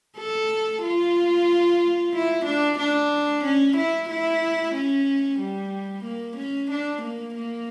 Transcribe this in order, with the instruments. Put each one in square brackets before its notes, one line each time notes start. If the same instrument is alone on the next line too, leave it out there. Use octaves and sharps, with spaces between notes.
[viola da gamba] A4
F4
E4
D4
D4
C#4
E4
E4
C#4
G3
A#3
C#4
D4
A#3
A#3